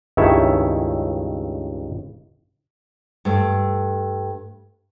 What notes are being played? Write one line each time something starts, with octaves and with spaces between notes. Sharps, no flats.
C#2 G2 D#3 E4 C#5 E5
G2 A3